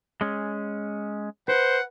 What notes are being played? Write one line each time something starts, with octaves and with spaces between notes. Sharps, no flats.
G#3 C#4
B4 C5 F#5